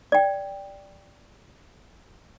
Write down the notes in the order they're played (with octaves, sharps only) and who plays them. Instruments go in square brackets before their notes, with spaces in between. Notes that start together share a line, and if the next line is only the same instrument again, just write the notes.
[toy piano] D5 G5